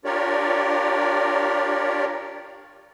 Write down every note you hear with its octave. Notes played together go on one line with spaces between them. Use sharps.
D4 F4 G4 A#4 C#5 D5